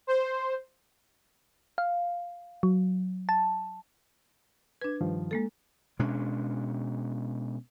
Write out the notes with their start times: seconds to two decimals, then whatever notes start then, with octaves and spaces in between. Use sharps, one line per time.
0.07 C5
1.78 F5
2.63 F#3
3.29 A5
4.81 D4 B4 G#6
5.01 G2 D#3 F3
5.31 G#3 A#3 A4
5.99 B2 G#3 C#4 D4